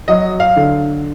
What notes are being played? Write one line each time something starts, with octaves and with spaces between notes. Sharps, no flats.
F#3 D#5
F5
D3